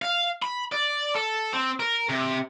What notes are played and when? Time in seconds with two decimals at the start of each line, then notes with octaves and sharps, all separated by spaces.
0.02 F5
0.42 B5
0.72 D5
1.15 A4
1.53 C4
1.80 A#4
2.09 C3